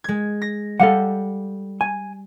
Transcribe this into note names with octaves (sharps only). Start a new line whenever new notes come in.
G#3 G#6
A#6
G3 A4 F5 F#5
G#5